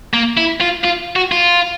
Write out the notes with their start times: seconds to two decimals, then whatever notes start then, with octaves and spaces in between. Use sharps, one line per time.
0.13 A#3
0.37 E4
0.61 F4
0.84 F4
1.16 F#4
1.32 F4